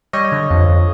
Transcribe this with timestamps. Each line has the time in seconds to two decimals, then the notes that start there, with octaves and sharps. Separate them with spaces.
0.13 G3 C#5 D#5
0.32 D3
0.50 F2
0.69 F2